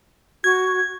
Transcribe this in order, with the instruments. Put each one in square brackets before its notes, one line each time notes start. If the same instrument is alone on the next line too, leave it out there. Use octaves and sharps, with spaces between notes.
[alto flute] F#4 [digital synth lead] G#6